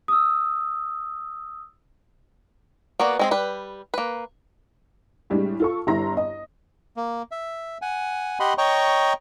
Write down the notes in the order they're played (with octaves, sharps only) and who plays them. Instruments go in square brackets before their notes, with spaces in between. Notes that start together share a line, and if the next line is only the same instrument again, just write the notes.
[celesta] D#6 E6
[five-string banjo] A#3 B3 F#4 D5
G#3 C4 G#4
G3 B4
A#3 B4
[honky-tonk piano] A2 G3 G#3 D4
F4 A4 C#6
G1 G2 E4 A#5 C6 A#6
D#5
[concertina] A#3
E5
F#5 G#5
G4 D#5 F#5 B5 C6
C#5 D#5 G5 A#5 C#6